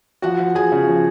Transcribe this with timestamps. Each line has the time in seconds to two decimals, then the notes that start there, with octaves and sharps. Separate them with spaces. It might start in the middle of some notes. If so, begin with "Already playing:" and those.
0.22 F3 F#4 F#5
0.39 F3
0.55 F3 G#4 G#5
0.72 C#3
0.88 F3